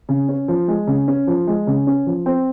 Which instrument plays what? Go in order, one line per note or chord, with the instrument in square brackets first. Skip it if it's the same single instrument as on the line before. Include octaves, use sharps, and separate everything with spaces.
[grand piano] C#3
C#4
F3
G#3
C#3
C#4
F3
G#3
C#3
C#4
F3
C4